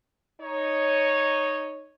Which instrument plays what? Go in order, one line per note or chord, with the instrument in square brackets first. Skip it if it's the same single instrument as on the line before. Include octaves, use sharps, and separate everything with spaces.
[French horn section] D#4 C#5